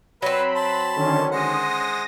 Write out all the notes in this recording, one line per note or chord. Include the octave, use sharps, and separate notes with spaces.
F#3 C4 B4 B5
A5 C6
D3 D#3 C#4
G#3 C5 F#5 D#6 A#6